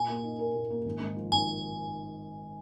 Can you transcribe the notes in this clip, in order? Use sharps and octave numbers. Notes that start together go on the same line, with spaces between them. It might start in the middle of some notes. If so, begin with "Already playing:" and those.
Already playing: A#2 G#5
A#3
D#4
A#4
A#2
A#3
G#1
G#2
F3
G#1 G#5